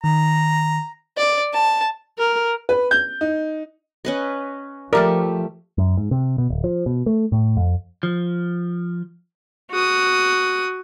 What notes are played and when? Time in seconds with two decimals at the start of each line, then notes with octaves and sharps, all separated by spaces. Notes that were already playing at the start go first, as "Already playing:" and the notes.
0.04 D#3 A#5
1.17 D5
1.53 A5
2.19 A#4
2.69 B4
2.91 G6
3.21 D#4
4.05 C#4 B4 D#5
4.93 F3 A3 G4 A#4 D5 E5
5.78 F#2
5.97 G#2
6.11 C3
6.38 B2
6.50 D1
6.64 F3
6.86 B2
7.06 A3
7.32 A2
7.57 F2
8.03 F3
9.71 F#4 D#6